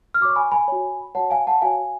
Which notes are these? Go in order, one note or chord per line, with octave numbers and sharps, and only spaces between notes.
F6
F#4 C#5 C#6 D6
G#5 B5
G#5 B5
F#4 C#5
F#4 C#5 F#5 A5
F5 G#5
F#5 A5
F#4 C#5 F5 G#5